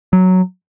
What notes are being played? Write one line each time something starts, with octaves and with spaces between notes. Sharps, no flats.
F#3